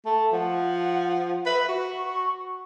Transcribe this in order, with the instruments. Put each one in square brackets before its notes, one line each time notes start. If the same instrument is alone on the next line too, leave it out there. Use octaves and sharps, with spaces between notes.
[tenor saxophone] A3 [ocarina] A5
[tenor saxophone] F3 [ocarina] F#5
[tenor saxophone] B4 [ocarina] E5
[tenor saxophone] F#4 [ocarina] C#6